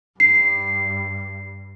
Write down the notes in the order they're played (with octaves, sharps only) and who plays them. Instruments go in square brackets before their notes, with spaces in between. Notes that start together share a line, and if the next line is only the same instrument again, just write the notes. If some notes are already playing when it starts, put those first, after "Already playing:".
[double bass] G2 [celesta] C7